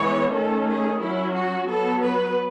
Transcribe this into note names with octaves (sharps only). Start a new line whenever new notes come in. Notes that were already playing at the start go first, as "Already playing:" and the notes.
Already playing: E3 G#3 B3 C#5
D#3 A3 C#4 A4
G#4
F#3 C#4 E4
F#4
F#3 B3 A4
B4